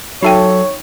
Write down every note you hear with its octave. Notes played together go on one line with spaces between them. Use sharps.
F#3 D#4 A4 C#5 E5 G5